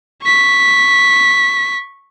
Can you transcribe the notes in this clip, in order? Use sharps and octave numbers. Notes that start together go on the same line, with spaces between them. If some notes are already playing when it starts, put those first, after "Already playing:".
C#6 B6